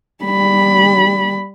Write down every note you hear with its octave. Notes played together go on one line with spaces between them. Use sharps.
G3 B5